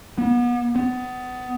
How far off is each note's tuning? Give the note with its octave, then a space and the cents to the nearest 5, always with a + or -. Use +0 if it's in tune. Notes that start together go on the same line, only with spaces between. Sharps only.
B3 -35
B3 +25